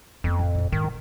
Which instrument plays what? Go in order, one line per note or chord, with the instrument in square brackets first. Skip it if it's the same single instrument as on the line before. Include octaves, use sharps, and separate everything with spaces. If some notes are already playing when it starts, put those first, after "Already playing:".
[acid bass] F2 [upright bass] A#3 B3
[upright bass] A1
F#1 A#2
[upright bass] G#2 [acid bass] D#3
[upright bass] D#1